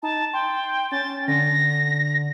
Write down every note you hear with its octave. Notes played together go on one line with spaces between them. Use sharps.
D#4 A5
G5 C6
C#4 A6
D3 A#6